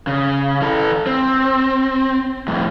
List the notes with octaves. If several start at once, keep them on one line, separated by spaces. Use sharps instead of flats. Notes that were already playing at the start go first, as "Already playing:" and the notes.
C#3
E3 A4
C4
F2 A2